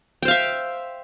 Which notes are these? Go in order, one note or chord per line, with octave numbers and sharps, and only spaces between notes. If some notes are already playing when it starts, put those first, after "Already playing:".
C5 E5 F5 G5